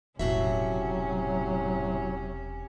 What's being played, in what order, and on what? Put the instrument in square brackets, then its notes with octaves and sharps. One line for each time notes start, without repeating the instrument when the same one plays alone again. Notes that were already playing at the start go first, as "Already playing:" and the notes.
[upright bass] E1 F3 [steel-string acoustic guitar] A2 F#4 E5 [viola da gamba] C3 C#4 [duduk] F#3